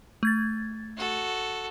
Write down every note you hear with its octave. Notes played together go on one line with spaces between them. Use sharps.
A3 G#6 A6
F#4 A4